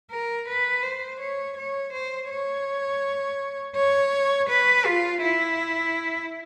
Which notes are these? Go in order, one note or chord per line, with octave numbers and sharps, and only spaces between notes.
A#4
B4
C5
C#5
C#5
C5
C#5
C#5
B4
F4
E4